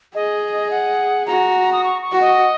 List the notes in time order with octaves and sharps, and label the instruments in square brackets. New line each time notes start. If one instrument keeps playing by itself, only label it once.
[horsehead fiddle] G#4 [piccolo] D#5
[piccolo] F#5
[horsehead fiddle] F#4 [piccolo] A#5
[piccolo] D#6
C#6
C#6
[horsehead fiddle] F#4
[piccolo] D#5